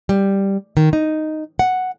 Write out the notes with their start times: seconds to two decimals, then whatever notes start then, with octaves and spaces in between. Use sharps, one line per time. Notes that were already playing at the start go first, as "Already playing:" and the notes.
0.09 G3
0.77 D#3
0.93 D#4
1.59 F#5